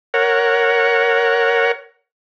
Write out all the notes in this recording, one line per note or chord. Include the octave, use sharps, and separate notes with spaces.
A#4 C#5 F#5